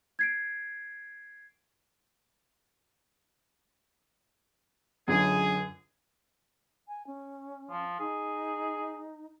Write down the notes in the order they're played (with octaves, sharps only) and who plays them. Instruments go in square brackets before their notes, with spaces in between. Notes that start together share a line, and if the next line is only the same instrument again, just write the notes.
[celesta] G#6 C7 D7
[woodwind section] C#2 G#4 [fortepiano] F#2 D3
[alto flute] G#5
C#4
[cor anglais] F3
[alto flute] D#4 [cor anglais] G#4